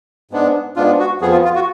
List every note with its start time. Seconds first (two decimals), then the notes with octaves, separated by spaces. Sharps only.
0.31 G#2 G#3 B3 D4
0.76 G#2 G#3 B3 D4 F4
0.99 F#4
1.21 F2 F3 B3 G#4
1.32 F4
1.44 F4
1.55 F#4